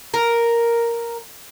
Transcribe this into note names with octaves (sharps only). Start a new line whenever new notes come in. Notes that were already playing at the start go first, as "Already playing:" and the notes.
A#4